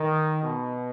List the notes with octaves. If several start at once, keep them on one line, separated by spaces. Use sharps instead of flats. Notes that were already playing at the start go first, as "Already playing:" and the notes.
Already playing: D#3
B2